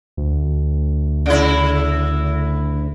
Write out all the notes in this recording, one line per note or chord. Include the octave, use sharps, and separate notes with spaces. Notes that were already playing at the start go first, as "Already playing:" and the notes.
D2
C#3 E4